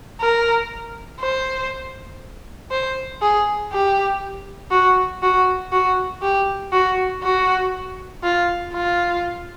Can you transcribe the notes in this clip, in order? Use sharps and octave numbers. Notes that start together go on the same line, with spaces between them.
A#4
C5
C5
G#4
G4
F#4
F#4
F#4
G4
F#4
F#4
F4
F4